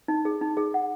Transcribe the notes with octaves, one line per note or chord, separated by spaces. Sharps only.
D#4
G#4
D#4
G#4
F#5